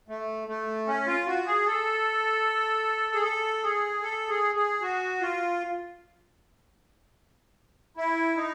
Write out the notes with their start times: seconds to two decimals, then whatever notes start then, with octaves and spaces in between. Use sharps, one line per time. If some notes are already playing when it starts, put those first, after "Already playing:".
0.08 A3
0.48 A3
0.87 C#4
1.07 F4
1.26 F#4
1.46 G#4
1.66 A4
3.14 G#4
3.23 A4
3.63 G#4
4.02 A4
4.29 G#4
4.55 G#4
4.82 F#4
5.21 F4
7.97 E4
8.36 D#4